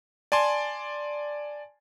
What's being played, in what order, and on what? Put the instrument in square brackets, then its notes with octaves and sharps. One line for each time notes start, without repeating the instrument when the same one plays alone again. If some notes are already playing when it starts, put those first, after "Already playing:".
[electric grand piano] D5 G#5 A5 C6